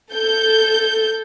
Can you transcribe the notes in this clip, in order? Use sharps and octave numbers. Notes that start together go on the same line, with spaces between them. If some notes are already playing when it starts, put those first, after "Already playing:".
A4 G6